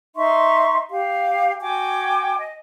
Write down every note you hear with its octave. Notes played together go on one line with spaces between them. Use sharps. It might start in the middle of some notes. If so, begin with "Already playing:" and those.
D#4 E5 C6 C#6
G4 F5
F#4 G5 G#5 D6
D#5